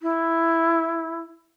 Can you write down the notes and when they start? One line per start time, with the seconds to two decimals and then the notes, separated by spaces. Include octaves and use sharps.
0.02 E4